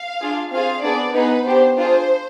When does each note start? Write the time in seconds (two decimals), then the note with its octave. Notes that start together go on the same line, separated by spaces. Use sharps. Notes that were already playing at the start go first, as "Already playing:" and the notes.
Already playing: F5
0.20 D4 F4 G#4
0.51 C4 F4 G#4 F5
0.83 B3 D4 G#4 D5
1.14 B3 D#4 G#4 B4
1.46 B3 D4 G4 C5
1.77 D4 F4 G#4 C5